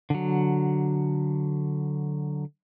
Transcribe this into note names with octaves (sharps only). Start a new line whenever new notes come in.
D3 F#3